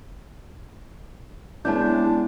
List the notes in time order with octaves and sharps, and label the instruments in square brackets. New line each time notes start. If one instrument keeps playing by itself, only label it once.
[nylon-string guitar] G#3 B3 C#4 [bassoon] D4 [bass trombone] E4 [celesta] A5 G6